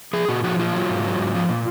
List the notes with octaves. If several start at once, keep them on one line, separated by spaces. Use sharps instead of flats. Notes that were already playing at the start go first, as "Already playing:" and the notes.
F3 G#4
A#2 F#4
F3 F#4
A#2 F4
F#3
G#2
F#3
G#2
F3
A#2